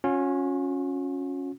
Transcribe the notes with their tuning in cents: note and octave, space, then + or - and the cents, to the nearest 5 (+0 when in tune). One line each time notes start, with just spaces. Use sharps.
C#4 -5 F#4 -45